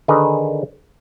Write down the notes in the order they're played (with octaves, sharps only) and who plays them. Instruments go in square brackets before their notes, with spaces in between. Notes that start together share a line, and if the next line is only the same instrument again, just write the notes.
[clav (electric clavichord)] D3 D#3 D#4 G#4 B4